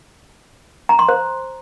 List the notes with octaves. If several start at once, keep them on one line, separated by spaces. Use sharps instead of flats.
A#5
C6
C5